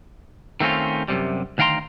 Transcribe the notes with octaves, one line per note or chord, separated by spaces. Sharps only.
D#3 A3 C4 C#4 F4
F#2 A2 C3 G3
D2 D#3 F5 G5 A#5 C6